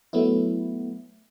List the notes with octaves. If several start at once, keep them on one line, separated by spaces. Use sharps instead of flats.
F#3 A3 B3 E4